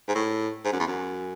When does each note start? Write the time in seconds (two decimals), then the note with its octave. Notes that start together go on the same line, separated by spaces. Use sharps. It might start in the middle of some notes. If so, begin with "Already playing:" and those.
0.08 G#2
0.15 A2
0.65 G#2
0.72 F#2
0.80 E2
0.87 F#2